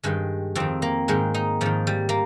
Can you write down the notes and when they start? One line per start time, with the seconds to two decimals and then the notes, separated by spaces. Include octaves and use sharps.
0.03 G2 D#3 G#3
0.55 F2 D#3 C4
0.82 A#3
1.08 G#2 D#3 G#3
1.34 D#4
1.61 G#2 D#3 F3
1.87 G3
2.09 A#3